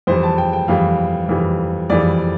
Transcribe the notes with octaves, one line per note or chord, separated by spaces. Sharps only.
F2 E3 G3 C5
A5
G5
G5
F2 E3 G3 F5
F2 E3 G3
F2 E3 G3 D5